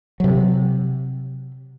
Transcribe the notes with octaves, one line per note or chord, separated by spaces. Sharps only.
C3 F#3